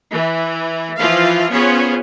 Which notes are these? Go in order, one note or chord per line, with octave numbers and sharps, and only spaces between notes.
E3
E3 F3 F4 F5
B3 C#4 F4 G#4 C5 C#5